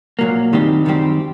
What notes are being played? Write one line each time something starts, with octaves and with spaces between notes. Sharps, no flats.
A#2 F#3 A#3
F#2 D#3 G3 C4 G4
F#2 D#3 G3 C4 G4